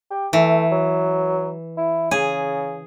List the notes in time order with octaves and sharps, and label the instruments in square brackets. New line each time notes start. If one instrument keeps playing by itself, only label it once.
[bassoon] G4
[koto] E3 [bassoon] A3
[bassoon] F#3
E4
[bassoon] C#3 [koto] G#4